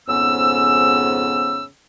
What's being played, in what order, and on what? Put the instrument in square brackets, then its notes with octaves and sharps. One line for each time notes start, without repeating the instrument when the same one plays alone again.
[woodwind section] F2 G#2 C#3 B3 C#4 E6